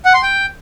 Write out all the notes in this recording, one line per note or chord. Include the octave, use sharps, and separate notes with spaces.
F#5
C6
G5